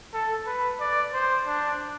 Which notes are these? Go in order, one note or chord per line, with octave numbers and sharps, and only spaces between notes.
A4
B4
D5
C5
D4